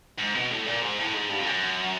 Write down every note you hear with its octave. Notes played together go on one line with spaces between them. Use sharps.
G#2
B2
A2
A#2
G#2
A2
G#2
G2
F2
F#2